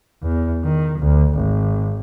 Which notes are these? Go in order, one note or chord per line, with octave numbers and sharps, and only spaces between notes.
E2
D#3
D2
G#1